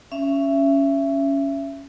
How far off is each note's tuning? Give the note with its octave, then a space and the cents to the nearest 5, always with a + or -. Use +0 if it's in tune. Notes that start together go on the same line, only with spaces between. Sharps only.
C#4 +5 E5 +25